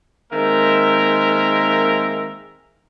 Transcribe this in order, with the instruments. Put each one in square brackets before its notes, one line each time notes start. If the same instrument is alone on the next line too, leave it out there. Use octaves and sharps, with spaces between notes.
[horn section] D#3 G#3 A#3 C4 A#4 E5